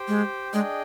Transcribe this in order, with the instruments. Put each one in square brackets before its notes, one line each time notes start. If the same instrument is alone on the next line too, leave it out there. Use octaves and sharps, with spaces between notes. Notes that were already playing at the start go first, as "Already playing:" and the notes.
Already playing: [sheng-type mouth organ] G4 C5 G5
[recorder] G#3
[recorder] G#3 [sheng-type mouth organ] D4 G#4 D#5 G5